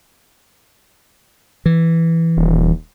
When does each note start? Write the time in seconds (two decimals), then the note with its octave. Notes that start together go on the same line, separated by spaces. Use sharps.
1.66 E3
2.37 D#1